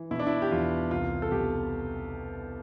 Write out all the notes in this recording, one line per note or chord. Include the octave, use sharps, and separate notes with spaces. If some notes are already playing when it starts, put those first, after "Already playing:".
Already playing: E3
B2 E4
D4
E4
G4
E2 F4
C2 F4
A4
B2 G4